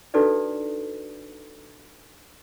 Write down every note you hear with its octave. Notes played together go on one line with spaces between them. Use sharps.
D4 D#4 F#4 A4 B4 D5